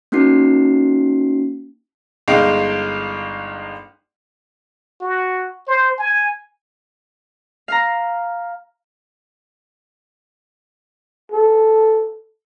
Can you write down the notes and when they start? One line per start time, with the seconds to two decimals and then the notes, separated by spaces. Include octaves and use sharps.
0.12 A#3 C#4 D#4 F#4 C7
2.28 G1 G#3 D#4 F5 G5
5.01 F#4
5.68 C5
5.99 G#5
7.68 F5 A#5
11.32 A4